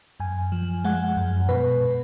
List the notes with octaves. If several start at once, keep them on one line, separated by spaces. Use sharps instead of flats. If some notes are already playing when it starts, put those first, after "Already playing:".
F#2 G#5
F3
G#3 F#5
F#2
B2 B4
B2